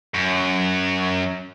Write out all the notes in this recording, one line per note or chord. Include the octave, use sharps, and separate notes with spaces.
F#2